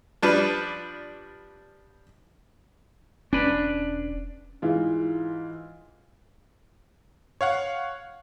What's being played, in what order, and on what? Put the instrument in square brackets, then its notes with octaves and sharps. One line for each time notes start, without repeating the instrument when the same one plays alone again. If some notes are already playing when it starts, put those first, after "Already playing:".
[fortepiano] F3 G3 D4 B4
[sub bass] E1 [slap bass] C#4 [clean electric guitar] D4 B4
[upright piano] G#2 E3 G#3 F4
[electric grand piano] C#5 F5 F#5